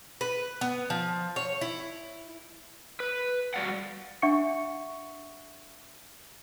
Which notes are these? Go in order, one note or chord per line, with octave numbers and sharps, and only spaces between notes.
B4
B3
F3
C#5
E4
B4
G3 F#4 D5 F5 F#5
D4 E5 F#5 C#6 C#7